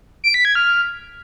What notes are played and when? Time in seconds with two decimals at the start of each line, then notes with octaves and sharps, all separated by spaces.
0.24 D7
0.34 B6
0.45 G#6
0.55 F6